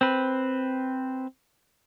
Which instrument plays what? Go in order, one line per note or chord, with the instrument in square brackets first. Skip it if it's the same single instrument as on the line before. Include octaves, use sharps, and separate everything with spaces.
[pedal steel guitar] C4 B4